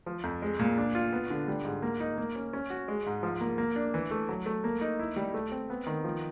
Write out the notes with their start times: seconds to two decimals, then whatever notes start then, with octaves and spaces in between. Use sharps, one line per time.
0.06 F3
0.24 F2
0.42 G#3
0.59 A#2
0.77 D4
0.95 F4
1.13 B3
1.30 D3
1.48 G3
1.65 G#2
1.82 A#3
2.00 D#4
2.18 A#3
2.35 C#4
2.53 C#4
2.70 F#4
2.88 G#3
3.06 G#2
3.23 F3
3.41 A#3
3.58 A#3
3.76 D4
3.94 E3
4.11 A3
4.29 F#3
4.46 A3
4.64 A#3
4.81 D#4
4.99 E4
5.16 G3
5.34 A3
5.52 C4
5.70 B3
5.87 D#3
6.04 F3